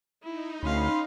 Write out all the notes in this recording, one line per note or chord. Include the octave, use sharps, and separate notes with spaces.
D#4 E4
D2 C#4 F5 B5 C6